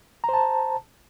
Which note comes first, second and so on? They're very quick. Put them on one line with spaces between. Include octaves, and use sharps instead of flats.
A#5 C5 A5